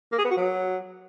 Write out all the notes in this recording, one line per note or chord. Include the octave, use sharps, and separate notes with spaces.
A#3
G#4
B3
F#4
F#3